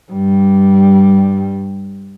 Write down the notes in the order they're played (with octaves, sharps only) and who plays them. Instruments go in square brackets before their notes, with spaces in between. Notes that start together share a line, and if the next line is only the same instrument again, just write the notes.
[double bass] G2 G3